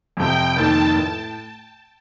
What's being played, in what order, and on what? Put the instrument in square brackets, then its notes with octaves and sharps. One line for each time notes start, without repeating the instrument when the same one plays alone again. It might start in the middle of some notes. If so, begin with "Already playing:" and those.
[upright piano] F2 C3 F3 C4 [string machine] G5
[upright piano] F1 F2 D#3 A#3 D#4 [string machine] A5
[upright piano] A2